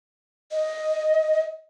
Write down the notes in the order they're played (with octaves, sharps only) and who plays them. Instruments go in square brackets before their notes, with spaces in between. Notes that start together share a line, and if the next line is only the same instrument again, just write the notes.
[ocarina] D#5